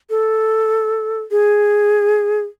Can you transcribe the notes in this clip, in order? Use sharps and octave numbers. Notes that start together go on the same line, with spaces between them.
A4
G#4